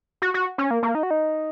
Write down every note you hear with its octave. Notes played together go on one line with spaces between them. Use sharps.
F#4
F#4
C#4
A#3
A#3
D#4
F#4
D#4